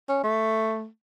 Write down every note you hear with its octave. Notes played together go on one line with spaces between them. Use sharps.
C#4
A3